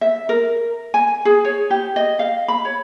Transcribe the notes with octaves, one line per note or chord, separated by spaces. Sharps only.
E5
A#4
G#5
G#4
C#5
G4
D#5
F5
B5
C#5